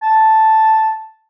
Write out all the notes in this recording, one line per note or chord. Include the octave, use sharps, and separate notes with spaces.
A5